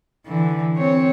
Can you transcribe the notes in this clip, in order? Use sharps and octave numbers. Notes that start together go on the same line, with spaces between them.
D3 E3
C4 C#5